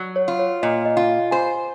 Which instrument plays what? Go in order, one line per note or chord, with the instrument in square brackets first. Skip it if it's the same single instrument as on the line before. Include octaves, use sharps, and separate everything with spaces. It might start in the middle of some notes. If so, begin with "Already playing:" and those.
Already playing: [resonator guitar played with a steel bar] F#3
[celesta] C#5
[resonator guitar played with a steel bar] F4
[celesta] C#5
[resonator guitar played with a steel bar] A#2 [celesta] D#5
[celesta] D#5
[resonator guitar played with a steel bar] F4
[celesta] F5
[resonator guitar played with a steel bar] C5 [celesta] G#5